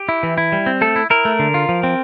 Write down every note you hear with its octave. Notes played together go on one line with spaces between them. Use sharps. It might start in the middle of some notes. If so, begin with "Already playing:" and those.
Already playing: G4
E4
E3
E4
G3
C4
A3 A4
E4
E4 A#4
A3
D3
F4
F3
C4